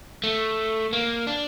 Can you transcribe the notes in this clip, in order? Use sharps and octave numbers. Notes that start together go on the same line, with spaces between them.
A3
A#3
D4